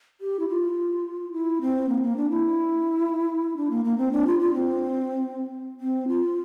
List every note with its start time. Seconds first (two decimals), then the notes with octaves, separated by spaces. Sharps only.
0.21 G4
0.39 E4
0.49 F4
1.33 E4
1.61 C4
1.89 A#3
2.03 A#3
2.16 D4
2.30 E4
3.57 D4
3.71 A#3
3.85 A#3
3.98 C4
4.12 D4
4.27 F4
4.40 F4
4.54 C4
5.80 C4
6.08 F4